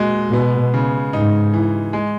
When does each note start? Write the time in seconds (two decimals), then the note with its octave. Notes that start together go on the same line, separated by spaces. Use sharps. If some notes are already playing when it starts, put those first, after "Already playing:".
Already playing: A#2 G#3 F#4
0.33 B2 B3
0.74 C#3
1.13 G#2 D#4
1.54 E3
1.93 G#3